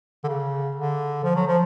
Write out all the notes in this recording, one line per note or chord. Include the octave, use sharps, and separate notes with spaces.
D3
C#3
D3
F3
F#3
F3